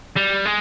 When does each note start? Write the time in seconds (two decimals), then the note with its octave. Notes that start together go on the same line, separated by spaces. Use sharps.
0.16 G3
0.45 G#3